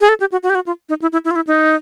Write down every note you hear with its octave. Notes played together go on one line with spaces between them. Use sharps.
G#4
A4
G4
F#4
F#4
G4
F#4
F4
D#4
E4
E4
E4
F4
E4
D#4